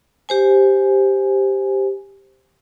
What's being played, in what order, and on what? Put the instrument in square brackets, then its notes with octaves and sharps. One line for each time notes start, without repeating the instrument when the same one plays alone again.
[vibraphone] G4 C5 G#5